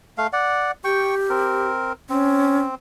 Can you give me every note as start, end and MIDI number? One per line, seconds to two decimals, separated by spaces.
0.18 0.27 57
0.18 0.27 77
0.33 0.71 74
0.33 0.71 78
0.84 1.68 67
0.84 1.15 79
0.84 1.15 85
1.30 1.93 60
1.30 1.93 70
2.10 2.75 60
2.10 2.64 61